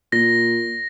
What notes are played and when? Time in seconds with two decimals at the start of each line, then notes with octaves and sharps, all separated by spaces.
0.12 A#2 A#6